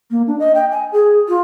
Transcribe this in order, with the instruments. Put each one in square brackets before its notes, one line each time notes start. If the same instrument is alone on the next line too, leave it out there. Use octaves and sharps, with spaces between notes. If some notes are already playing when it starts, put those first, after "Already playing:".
[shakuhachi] A#3
D4
D#5
G5
G#5
G#4
F4